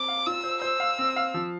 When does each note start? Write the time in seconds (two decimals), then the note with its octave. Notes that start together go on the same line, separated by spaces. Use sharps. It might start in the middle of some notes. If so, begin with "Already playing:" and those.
Already playing: C4 D6
0.08 F5
0.26 F4 E6
0.44 C5
0.62 C5 E6
0.80 F5
0.98 C4
1.16 F5
1.34 F3